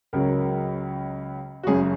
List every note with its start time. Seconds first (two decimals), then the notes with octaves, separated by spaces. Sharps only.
0.13 C#2 C#3 F#3 A#4
1.63 F#4
1.67 F#1 F#2 C#3 G#4